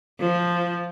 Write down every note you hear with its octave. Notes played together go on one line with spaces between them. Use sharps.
F3